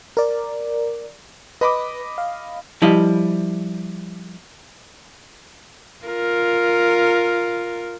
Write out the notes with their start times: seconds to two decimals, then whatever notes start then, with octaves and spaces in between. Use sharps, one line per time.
0.17 A#4 D5
1.61 B4 D#5 B5 D6
2.18 F5
2.82 F3 G3 E4 D#5
6.05 F4 A#4